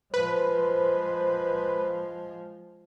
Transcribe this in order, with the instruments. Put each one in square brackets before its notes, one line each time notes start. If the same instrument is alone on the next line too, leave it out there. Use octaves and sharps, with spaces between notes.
[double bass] F3 G#3 [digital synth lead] B4 [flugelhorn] C5